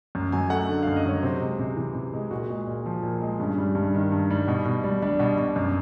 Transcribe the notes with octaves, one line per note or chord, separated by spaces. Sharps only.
F#2
F#3 G#5
A3 F#5
D3
F#2 F5
D#5
F#3 C#5
C3 C5
G#3
C3
E3
C3
G#3
A#2 F#4
G#3
A#2
F3
A#2
G#3
G2 C#4
G3
G2
D#3
G2
G3
B2
B2
G3
G3 D4
B2
B2
F#2